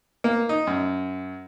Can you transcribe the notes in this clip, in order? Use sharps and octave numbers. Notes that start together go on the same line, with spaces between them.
A#3
D#4
F#2